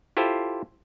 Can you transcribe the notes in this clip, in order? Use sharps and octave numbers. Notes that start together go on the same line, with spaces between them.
E4 F4 G4 A4 C5